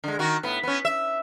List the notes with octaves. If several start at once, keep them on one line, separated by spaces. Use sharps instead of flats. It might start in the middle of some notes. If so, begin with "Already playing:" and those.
D3 G#3
D#3 F#4
A2 B3
B3 C#4
E5